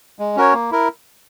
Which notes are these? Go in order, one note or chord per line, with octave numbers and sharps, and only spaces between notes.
G#3
C#4 F#4 A#4 C#5
A#3
E4 A#4